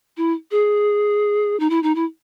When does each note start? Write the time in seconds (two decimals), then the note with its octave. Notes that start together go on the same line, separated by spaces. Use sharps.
0.17 E4
0.51 G#4
1.60 D#4
1.70 E4
1.83 D#4
1.95 E4